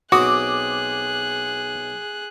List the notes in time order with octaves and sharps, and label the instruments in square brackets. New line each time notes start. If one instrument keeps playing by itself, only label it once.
[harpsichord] B1 C4 D#6 [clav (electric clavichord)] F#4 [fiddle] G#4 F#6 [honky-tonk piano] D6